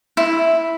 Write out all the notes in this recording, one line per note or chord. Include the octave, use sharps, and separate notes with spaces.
E4